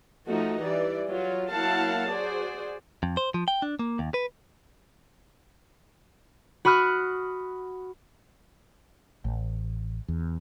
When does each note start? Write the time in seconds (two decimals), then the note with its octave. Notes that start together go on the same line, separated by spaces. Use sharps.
0.27 F3 A3 D#4 F#4
0.60 E3 G3 D5
1.09 F#3 F4
1.51 F#3 A#3 E4 F5 F#5 A5
2.09 F#4 G#4 C5 D5
3.03 F2
3.17 C5
3.34 F3
3.48 G5
3.62 D4
3.79 A#3
3.99 D#2
4.14 B4
6.65 F#4 B5 D#6 F6 F#6
9.25 A1
10.08 E2